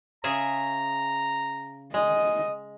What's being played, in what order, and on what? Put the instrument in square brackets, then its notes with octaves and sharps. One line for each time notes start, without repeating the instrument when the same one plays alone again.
[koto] C#3 G#4 E5 [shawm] A#5
[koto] G#3 [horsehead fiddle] D#5